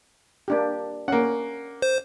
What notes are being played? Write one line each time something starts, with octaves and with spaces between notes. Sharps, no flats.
A#3 D4 G4
A#3 C#4 F#5
C5